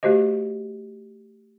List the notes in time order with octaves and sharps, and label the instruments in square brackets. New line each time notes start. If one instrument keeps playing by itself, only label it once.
[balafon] A3 F#4 G4 C5 D#5